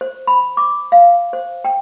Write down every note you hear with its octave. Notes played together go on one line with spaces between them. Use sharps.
C5
B5
D6
F5
C5
G5